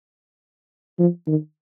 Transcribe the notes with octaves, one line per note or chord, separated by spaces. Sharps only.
F3
D#3